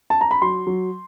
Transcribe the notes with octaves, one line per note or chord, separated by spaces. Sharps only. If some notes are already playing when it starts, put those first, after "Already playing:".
A5
A#5
B5
F#3 C6
F#3